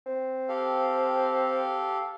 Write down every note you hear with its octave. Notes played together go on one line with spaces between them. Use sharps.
C4
G4 A4 F5